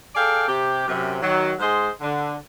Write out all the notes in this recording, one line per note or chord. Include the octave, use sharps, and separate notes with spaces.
G#4 A4 D5 F5 G5
C3 G4
F#2 C3
D#3 F#3
G#2 G#4 C5 D#5 C6
D3